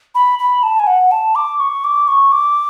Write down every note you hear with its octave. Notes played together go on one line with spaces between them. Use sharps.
B5
B5
A5
G#5
F#5
A5
D6
C#6
D6
C#6
D6